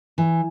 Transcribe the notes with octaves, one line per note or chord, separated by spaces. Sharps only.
E3